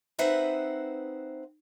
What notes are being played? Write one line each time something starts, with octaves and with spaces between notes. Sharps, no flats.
C4 D#4 B4 C5 E5 F#5